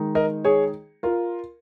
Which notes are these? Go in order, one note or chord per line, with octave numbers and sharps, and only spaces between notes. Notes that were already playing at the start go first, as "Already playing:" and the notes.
Already playing: D#3 G#3 D#4
A#4 D#5
G#4 C#5
F4 A#4